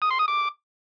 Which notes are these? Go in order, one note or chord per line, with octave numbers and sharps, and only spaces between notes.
D#6
C6
D#6
D6